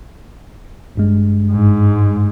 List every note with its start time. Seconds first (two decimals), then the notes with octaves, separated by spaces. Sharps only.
0.95 G#1 G2 G#3
1.51 G#2